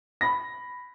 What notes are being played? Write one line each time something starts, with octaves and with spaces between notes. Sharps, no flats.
B5 A#6